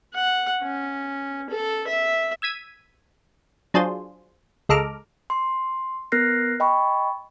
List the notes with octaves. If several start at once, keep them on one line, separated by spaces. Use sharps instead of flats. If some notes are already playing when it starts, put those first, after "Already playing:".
F#5
C#4
A4
E5
E6 G#6 B6 D#7
F#3 D4 F4 G#4 C5
C#2 G#3 A4 A#5 D6 F6
C6
B3 A#4 F6 F#6 A#6 C7
D#5 G5 B5 C#6